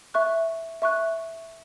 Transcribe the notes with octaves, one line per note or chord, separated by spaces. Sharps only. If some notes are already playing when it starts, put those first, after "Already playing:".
E5 C#6 F#6
E5 C#6 F#6